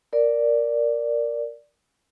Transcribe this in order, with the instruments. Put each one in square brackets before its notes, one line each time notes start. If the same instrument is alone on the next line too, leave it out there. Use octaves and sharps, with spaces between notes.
[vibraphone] A#4 D5